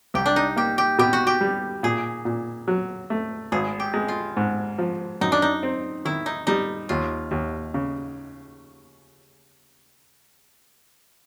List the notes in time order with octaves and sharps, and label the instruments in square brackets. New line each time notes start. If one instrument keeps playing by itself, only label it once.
[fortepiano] C2 [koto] G4
[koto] D4
D#4
[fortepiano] A#3 [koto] G4
[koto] G4
[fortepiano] B2 [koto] G4
[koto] F#4
G4
[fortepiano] G3
[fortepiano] A#2 [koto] G#4
[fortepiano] A#2
F#3
A3
[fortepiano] G#1 [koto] G#4
[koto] G4
[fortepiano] G#3
[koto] F4
[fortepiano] G#2
F3
[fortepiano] F#2 [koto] D#4
[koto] D4
D#4
[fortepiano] C4
[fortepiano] D#3 [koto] E4
[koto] D#4
[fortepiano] G3 [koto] D#4
[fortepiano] D#2 [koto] F4
[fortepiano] D#2
C#3